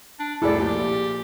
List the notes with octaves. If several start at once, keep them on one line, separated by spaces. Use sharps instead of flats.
D4
C2 F2 A2 E4 G#4 A4 D5
A#2 F3 G4